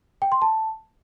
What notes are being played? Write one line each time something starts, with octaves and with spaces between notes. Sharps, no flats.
G5
C6
A5